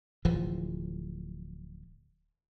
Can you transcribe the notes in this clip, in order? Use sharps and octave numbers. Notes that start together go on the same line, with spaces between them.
D1 E3 F3